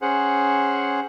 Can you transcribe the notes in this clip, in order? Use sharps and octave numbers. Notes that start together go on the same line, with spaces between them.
C#4 G#4 C5 F#5